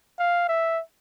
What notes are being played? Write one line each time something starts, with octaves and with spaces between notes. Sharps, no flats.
F5
E5